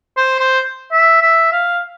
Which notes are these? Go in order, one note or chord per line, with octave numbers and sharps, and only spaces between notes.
C5
C5
E5
E5
F5